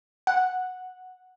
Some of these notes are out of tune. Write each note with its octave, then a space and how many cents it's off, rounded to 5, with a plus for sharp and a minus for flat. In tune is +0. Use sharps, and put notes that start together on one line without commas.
F#5 -5